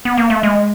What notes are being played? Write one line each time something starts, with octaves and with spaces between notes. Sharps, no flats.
B3
A#3
A3
G#3